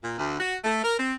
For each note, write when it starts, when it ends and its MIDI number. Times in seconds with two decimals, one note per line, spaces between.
0.03 0.18 46
0.18 0.35 38
0.40 0.57 66
0.65 0.79 57
0.84 0.97 70
0.98 1.13 60